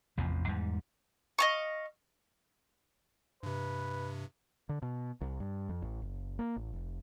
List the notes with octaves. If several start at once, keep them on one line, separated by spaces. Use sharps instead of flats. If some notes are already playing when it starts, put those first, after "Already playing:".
A1 E2 C3 F3
E2 G#2 G3
D#5 F5 C#6
G2 C3 B4
D3
B2
C2
G2
F2
A1
F#1
A#3
A1
F1